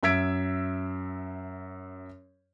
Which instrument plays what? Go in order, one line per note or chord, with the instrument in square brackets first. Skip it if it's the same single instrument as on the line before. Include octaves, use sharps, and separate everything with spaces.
[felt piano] F#2 E5 E6 G#6 B6 D7